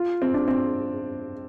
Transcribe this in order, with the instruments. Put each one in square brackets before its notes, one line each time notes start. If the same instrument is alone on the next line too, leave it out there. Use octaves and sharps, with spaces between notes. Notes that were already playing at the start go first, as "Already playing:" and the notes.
Already playing: [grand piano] F4
C4
D4
C4